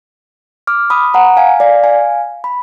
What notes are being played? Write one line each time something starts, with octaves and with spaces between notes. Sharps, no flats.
D6 F6
B5 D#6
F#5 A#5
F5 G#5
D5 F5
F5 G#5
B5